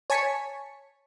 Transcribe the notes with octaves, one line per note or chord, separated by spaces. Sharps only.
C#5 G#5 A5 C#6 B6 C#7